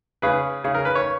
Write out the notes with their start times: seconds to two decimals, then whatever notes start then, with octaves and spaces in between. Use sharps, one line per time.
0.22 C#3 G#4 B4
0.64 C#3 G#4
0.75 A#4
0.85 B4
0.95 C#5